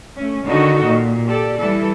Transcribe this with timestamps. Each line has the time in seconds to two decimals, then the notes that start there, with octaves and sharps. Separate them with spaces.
0.16 A3 C#4
0.46 D3 D#3 D#4 F#4 A4
0.87 A#2
1.26 G4 A4 D5
1.58 E3 G3 E4 A4